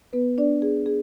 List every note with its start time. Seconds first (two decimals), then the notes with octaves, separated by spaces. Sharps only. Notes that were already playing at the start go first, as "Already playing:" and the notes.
0.13 B3 B4
0.38 D4 D5
0.62 G#4
0.86 G#4